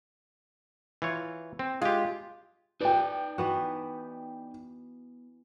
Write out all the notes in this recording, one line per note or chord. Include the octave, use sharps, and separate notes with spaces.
E3 F4 C#5
C4
G#3 F4 G4
D#4 B4 D5 G5
E3 B3 F#4